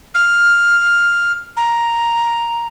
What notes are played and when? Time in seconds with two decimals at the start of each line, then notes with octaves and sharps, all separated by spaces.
0.15 F6
1.57 A#5